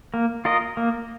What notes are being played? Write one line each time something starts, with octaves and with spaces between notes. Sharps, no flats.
A#3
F4 A#4 D#5
A#3